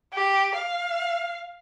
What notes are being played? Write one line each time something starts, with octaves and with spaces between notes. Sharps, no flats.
G4
F5